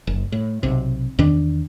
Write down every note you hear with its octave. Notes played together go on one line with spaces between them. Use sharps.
F#1
A2
B1 C3
E2 D#3 D4